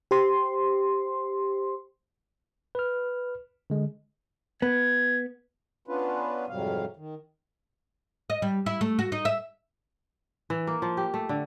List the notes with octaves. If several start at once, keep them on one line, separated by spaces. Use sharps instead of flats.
G4 C5 C6
B4 F6
D3 G#3
B3 G#6
B3 C#4 D4 F4 B4
F2 G#2 C3 F#3 G3 F5
D#3
D#5
G3
E4
A3
F#4
D#4
E5
E3
A#3
F3
G4
A3
D3